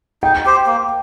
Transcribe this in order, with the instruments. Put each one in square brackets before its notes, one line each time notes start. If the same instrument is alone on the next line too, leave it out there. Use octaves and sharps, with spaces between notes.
[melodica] D#4 [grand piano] G5
[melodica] G4 C5
A#3